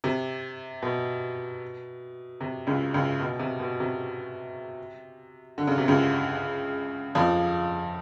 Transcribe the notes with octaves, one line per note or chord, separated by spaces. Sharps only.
C3
B2
C3
C#2 C#3
C#2 C#3
B2
C3
B2
C3
D3
C#3
C3
C#2 C#3
F2 F3